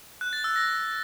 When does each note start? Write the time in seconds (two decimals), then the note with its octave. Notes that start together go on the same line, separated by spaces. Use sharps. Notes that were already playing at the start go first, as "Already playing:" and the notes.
0.21 F#6
0.33 A6
0.44 E6
0.56 A#6